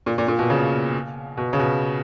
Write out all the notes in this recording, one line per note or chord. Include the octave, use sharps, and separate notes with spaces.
A#2
A#2
A#2
B2
C#3
B2
C#3
B2